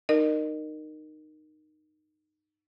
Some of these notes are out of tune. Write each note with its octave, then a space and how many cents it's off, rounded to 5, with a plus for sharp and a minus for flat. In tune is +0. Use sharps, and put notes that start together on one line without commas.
D#4 -15 A#4 +0 D#5 -30